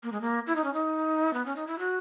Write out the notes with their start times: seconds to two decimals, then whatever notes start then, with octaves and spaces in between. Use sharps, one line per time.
0.03 A#3
0.12 G#3
0.21 A#3
0.47 E4
0.56 D#4
0.64 C#4
0.74 D#4
1.33 B3
1.46 C#4
1.56 D#4
1.67 E4
1.79 F#4